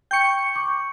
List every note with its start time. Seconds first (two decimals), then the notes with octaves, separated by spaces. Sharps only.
0.11 G5 C#6 G6 C#7
0.55 C#6 D6